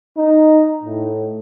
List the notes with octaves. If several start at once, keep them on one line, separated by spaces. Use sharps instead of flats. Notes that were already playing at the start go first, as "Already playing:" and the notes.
D#4
A2